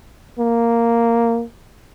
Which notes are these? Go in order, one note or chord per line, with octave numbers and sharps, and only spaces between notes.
A#3